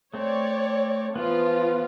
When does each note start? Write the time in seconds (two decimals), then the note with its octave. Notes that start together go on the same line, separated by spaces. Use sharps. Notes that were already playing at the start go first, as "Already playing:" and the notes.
0.14 A3 C4 C#5 D5
1.16 E3 F3 B3 F4